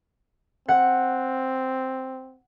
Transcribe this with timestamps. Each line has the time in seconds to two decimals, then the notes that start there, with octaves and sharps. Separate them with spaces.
0.68 C4 F#5